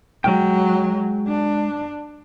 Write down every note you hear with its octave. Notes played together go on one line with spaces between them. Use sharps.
F#3 G#3 G5
D4